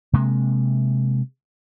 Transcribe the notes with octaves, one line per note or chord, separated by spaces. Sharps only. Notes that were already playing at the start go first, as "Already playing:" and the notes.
C3 G#3 A#3